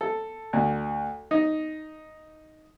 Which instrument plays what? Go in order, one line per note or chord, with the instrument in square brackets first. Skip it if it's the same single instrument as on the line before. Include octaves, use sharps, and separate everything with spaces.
[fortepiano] A4
D2
D#4